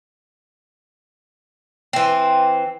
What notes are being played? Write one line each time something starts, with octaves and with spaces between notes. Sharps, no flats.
E3 C4